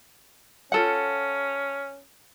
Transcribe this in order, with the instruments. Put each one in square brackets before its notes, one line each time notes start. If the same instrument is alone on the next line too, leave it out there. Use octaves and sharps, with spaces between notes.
[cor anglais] C#4 [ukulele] F4 A4 F#5